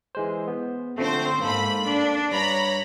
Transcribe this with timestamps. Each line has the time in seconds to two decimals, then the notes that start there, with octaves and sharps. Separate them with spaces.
0.15 E3 G#3 C5
0.48 B3
0.98 D3 F3 A3 C4 C5
1.41 G#2 A#3 A4 B5
1.87 D4
2.31 G2 C#5 A#5 B5